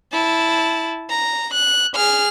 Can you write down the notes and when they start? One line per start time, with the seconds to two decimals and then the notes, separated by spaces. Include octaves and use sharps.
0.12 E4 A5
1.10 A#5
1.54 F#6
1.95 G#4 F6